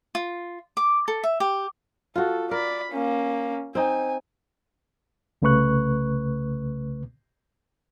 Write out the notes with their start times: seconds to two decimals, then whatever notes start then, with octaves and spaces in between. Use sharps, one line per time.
0.15 F4
0.77 D6
1.08 A4
1.24 E5
1.40 G4
2.16 F4 F#4 A4
2.51 A#4 D5 B5
2.92 A#3 C#4
3.75 C4 D#4 G#5
5.42 C2 C#3 A3 B4 C#6 F#6